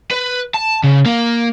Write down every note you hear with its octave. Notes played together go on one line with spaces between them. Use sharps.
B4
A5
C#3
A#3